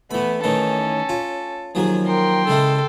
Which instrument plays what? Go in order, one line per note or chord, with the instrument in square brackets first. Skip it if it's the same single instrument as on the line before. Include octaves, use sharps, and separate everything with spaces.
[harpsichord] E3 B5 [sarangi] A3 [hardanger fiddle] B3
[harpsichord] A2 D#3 E3 [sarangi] C#4 [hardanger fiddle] A4
[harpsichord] F4
[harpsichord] D#2 F3 F#3 [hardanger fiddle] G#4
[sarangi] A#4 [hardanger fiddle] G5 C6
[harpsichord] C#3 G#3 E4 [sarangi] A4